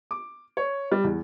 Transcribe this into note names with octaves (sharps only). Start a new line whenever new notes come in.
D6
C#5
G3
E2